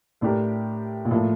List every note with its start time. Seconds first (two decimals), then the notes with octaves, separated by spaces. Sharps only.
0.21 A2 A3 D4 G4 A#4
1.05 A#2
1.11 A2 F3 A#3 F4 A4